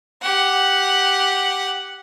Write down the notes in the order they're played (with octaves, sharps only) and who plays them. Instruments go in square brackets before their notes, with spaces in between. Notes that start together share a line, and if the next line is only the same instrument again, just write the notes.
[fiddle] G4 F#5